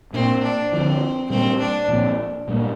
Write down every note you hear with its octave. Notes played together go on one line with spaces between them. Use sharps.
A#2 A#3 C4 D4
D4
D3 F3 C4 D4
A#2 G3 A#3 C4 D4
D4
A#2 F3 C4
A#2 G3 A#3 D4